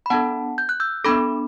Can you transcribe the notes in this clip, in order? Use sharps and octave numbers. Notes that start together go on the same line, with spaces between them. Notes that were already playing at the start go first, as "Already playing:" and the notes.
B5
B3 D4 A4 F#5 A5
G6
F#6
E6 G6
B3 D4 A4 B5 D6